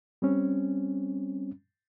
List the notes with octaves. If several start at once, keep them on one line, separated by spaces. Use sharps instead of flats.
G3 C4 C#4